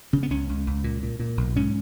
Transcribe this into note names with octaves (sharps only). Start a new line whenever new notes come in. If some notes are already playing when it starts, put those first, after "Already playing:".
C#3 C#4
B3
C#2 C#4
C#2
C#2
A#2
A#2
A#2
B1
G#2 C#4